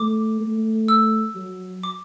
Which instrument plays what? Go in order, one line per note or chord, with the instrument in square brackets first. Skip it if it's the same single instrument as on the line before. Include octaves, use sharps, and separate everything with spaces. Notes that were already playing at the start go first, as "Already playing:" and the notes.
Already playing: [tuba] A3 [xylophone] D6
[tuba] A3
[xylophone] E6
[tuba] F#3
[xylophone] D6